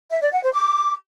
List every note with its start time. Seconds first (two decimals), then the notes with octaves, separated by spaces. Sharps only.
0.11 E5
0.22 D5
0.32 F#5
0.43 C5
0.53 D6